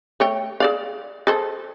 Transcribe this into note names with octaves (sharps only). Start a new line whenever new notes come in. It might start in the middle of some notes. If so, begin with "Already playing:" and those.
A3 C#5 G5
G#4 D5 F5
G#4 A4 C5